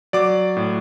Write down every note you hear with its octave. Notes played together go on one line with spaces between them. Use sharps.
F#3 D5 D6
A2